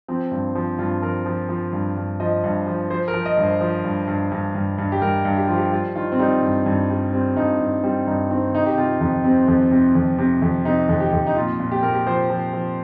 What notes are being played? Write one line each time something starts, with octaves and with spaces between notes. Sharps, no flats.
F3 C4
G2
F3
G2 F4
F3 A#4
F3
F3
G2
G2
F3 D#5
G2
F3
F3 C5
A#4
F3
D#5
G2
C5
F3
G2
G2
G2
G2
G2
G4
G2 A#4
G2
G4
F3 F4
G4
G3 F4
D#3 F4
C4
G3 D#4
G2
G2
G3
G3 C4
G2 D#4
G2
G3 C4
G2 D#4
D#3 C4
C3 D#4
G4
C3 F4
F2 D#4
C3 C4
F2
C3
F2
C3
F2
C3 D#4
F2
G4
F2
D#4
A#2 F4
A#2
G4
A#2 A#4
G4
F3 C5
F3
F3